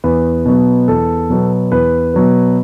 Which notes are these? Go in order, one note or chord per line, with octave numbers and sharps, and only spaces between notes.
E2 B4
B2 F#3 B3
E2 A4
B2 F#3 B3
E2 B4
B2 F#3 B3